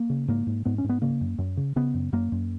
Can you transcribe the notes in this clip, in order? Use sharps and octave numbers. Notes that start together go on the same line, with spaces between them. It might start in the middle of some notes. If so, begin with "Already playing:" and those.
Already playing: A#3
C#3
G#2 A#3
G#2
G#2 B3
C#4
G#2
B3
C#3 A#3
F#2
F#2
C#3
C#3 B3
F#2
F#2 A#3
F#2